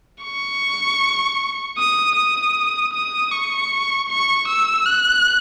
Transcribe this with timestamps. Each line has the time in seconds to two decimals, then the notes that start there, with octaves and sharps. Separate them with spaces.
0.24 C#6
1.78 D#6
2.16 D#6
2.93 D#6
3.32 C#6
4.09 C#6
4.48 E6
4.86 F#6